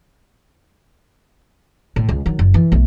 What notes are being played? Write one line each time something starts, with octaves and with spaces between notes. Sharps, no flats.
A2
C#2 G#3
D#3 F#3
F#1
E3
B1 A3